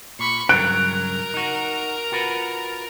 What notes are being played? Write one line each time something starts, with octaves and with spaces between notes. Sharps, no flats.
A#2 B5 C#6
G2 C#3 F#3 A#4 F#6 D7
D#4 F#4
F4 F#4 B4